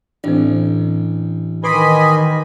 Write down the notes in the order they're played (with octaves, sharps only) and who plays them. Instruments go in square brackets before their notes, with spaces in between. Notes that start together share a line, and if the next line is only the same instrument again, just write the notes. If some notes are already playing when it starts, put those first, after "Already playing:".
[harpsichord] A1 [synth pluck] C4 D4
[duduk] D#3 [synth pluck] B4 C6 D6 [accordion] D#5 G#5 B5